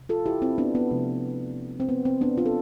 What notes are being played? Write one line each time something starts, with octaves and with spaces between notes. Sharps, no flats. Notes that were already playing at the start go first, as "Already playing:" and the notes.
Already playing: C3
F4 A4
E4 G4
C4 E4
B3 D4
B3
C3 F3 A3
C4
B3
C4
B3 D4
D4 F4
A4